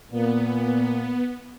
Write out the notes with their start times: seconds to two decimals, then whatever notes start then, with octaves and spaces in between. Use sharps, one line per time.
0.12 A#2 A#3 B3